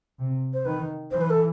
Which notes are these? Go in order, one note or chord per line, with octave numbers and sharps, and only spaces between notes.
C3
C5
D#3 B4
E3 C5
B4
A4